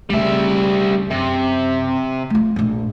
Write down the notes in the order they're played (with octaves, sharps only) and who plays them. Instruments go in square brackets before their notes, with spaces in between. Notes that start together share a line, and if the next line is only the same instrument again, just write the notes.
[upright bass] D2 C#3 [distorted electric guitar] G3 E5
[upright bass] F#2 [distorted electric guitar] C3
[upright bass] A3 F4
A#1 A2